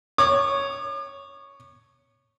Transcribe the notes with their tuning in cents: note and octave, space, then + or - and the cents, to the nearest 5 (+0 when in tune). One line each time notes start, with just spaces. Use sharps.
C#5 +0 D6 +45